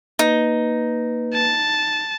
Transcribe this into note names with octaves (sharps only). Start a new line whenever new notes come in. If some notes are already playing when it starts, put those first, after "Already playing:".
A#3 D#4 B4
A5